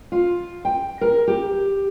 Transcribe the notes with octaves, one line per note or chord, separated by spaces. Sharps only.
F4
G5
A#4
G4